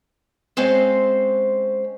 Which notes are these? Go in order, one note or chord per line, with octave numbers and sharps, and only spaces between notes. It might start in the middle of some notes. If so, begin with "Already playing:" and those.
G#3 C4 C#4 C5 F5